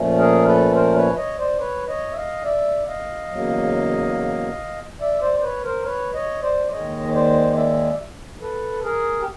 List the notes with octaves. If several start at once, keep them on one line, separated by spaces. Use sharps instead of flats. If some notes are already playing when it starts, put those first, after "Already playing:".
Already playing: A#2 F3 A3 C#4
G#4 A#4
A4 B4
A#4 C5
B4 C#5
C#5 D#5
C5 D5
B4 C#5
C#5 D#5
E5
D#5 F5
D5 E5
D#5 F5
E2 C#3 F#3 A#3
D5 E5
C5 D5
C5
B4 C#5
A#4 C5
B4 C#5
C#5 D#5
C5 D5
D#2 D#3 G#3 C#5 D#5
C#5
C5 D5
D5 E5
A4 B4
G#4 A#4
G4